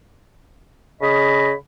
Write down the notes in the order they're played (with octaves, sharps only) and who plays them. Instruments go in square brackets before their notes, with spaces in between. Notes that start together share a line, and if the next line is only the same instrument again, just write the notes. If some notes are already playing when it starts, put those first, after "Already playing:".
[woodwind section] C#3 D#5 B5